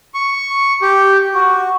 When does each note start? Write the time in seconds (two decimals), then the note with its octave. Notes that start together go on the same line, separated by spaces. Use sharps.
0.14 C#6
0.82 G4
1.34 F#4